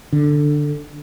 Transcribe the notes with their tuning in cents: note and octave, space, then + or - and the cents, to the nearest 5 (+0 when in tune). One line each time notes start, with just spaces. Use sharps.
D3 +10